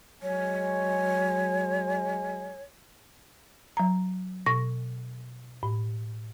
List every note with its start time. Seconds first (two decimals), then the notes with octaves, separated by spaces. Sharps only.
0.22 F#3 G#3 C#5 G#5
3.77 F#3 A#5
4.46 B2 C#6 A#6
5.63 A2